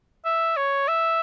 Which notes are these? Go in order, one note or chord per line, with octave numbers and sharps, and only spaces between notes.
E5
C#5
E5